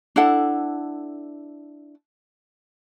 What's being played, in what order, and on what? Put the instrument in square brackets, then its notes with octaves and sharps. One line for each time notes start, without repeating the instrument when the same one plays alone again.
[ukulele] D4 E4 A4 F#5